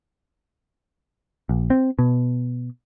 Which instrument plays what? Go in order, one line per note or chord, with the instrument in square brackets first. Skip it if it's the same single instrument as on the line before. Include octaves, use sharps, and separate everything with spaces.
[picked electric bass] A#1
C4
B2